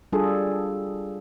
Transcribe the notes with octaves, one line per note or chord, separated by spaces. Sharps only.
G3 D4 F4 G#4 A4